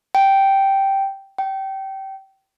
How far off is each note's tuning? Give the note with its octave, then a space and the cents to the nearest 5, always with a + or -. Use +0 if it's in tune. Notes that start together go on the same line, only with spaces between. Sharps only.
G5 -5
G5 -25